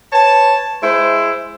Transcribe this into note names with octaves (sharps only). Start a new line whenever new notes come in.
B4 C#5 A5
G#3 E4 C5